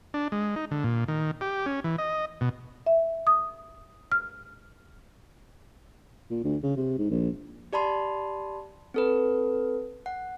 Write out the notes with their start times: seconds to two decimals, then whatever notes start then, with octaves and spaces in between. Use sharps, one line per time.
0.14 D4
0.32 G#3
0.56 D#4
0.71 D3
0.84 A#2
1.08 D#3
1.41 G4
1.66 C#4
1.84 E3
1.98 D#5
2.41 B2
2.86 E5
3.27 D#6
4.12 F6
6.30 A#2
6.44 D2
6.63 C#3
6.77 C3
6.98 G#2
7.10 A#1
7.73 G4 D5 A5 B5 C6
8.94 C4 A4 B4
10.06 F#5